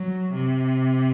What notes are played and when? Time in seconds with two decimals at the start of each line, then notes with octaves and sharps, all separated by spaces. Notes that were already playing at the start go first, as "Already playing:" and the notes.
Already playing: F#3
0.34 C3